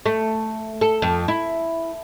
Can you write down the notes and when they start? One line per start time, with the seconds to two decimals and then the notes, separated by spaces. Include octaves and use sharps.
0.06 A3
0.81 A4
1.02 F2
1.28 E4